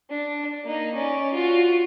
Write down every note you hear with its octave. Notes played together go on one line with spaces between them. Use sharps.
D4
A#3 D#4
C#4 D5
F4 F#4